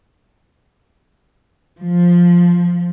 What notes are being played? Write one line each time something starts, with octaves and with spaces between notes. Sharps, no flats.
F3